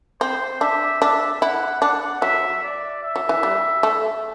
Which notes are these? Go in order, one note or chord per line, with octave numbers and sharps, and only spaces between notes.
C4 C5
D4 E5
D4 E5
E4 F#5
D4 F#5
F#3 E5
D5
E5
F#3
E3
G3
A3